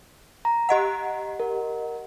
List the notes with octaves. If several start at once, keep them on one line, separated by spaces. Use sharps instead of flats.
A#5
G4 D#5 F#5
A#4